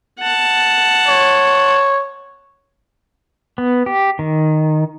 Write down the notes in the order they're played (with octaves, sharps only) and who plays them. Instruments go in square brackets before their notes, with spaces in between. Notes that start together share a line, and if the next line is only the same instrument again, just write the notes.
[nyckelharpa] F#5 A5
[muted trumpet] C#5
[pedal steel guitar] B3
G4
D#3